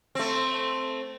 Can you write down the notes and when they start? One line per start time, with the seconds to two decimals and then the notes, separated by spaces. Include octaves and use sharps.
0.15 A3 C4